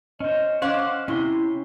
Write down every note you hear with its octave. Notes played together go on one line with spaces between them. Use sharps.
C#4 C5 D#5
C#4 C5 F5 F#5 D6
C3 C#4 E4 C6